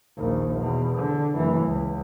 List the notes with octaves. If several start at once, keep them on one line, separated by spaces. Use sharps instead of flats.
A#1 D#2
E2 B2
D3
F#1 E3
C#2